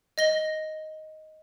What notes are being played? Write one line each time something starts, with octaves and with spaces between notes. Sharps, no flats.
D#5 A#6 G7